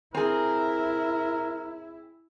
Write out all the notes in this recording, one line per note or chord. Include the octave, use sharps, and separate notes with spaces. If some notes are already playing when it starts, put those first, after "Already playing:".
C4 E4 G#4 A#4